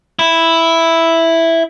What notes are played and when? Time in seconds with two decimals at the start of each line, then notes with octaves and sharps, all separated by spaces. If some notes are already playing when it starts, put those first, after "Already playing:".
0.19 E4